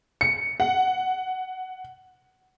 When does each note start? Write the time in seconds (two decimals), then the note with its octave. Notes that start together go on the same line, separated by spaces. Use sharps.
0.21 C#7
0.60 F#5